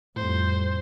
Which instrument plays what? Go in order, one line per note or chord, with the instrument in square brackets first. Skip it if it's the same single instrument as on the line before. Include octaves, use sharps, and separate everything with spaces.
[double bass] F2 G3 [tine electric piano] A2 [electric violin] C5